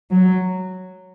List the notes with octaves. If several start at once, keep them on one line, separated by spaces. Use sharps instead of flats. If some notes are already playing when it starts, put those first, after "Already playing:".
F#3